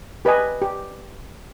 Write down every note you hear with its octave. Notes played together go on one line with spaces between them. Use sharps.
G4 B4 D#5 G#5
G4